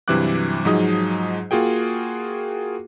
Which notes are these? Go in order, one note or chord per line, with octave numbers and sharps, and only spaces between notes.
G2 C3 E3 F#3 D6 F#6
G#2 F3 F#3 D#4 G#4 D#6
A#3 F4 F#4 G#4 G5